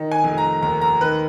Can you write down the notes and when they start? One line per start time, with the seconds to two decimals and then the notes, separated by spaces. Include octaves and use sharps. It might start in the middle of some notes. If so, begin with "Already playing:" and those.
Already playing: D#3
0.12 G#5
0.24 F1
0.38 A#5
0.62 D#2 A#5
0.81 A#5
1.01 D#3 B4